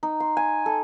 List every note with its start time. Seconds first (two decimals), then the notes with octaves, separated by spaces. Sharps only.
0.03 D#4
0.20 C6
0.37 G#5
0.66 A4